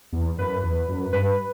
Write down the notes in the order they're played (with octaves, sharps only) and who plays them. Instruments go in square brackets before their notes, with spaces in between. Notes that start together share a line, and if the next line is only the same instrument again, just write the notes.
[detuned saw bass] E2
[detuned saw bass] F#2 [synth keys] B4
[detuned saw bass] E2
F#2
[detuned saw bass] G2 [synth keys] B4